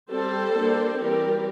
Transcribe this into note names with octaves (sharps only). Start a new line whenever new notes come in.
G3 C4 A4 C5
G3 A#3 D4
E3 G3 C4 G4 A#4